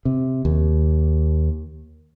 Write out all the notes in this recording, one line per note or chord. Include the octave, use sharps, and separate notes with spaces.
C3
D#2